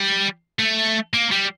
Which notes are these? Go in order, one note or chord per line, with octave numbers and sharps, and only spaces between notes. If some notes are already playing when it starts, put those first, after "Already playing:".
Already playing: G3
A3
A#3
G3